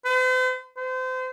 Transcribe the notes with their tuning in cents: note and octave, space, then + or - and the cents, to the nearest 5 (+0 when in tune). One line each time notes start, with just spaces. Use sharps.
C5 -45
C5 -30